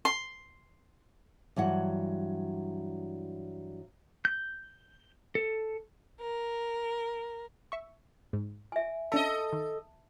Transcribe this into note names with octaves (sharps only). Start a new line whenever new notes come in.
C6
G2 E3 F#3 F#5
G6
A4
A#4
E5 C#6
G#2
E5 G#5
C#4 D4 A4 D#5 E5 A5
D#3